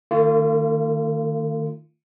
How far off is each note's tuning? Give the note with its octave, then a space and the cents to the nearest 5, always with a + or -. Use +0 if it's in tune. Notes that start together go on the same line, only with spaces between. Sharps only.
D#3 -20 A3 +40 F4 -25